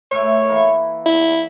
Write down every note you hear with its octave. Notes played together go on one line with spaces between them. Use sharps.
A2 A3 C#5
E3 A#3
E4